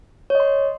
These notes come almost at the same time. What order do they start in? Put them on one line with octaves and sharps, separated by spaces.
C#5 D#5 C6